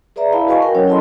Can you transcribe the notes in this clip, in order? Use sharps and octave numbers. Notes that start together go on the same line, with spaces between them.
G#4 B4 D5 E5 A#5
E4 F5 A5 B5
F#4 B4 D#5 F5 G#5 C#6
F#4 A#4 F#5 G5
F#3 C#4 C#5
E4 A4 D#5 A5 B5 C6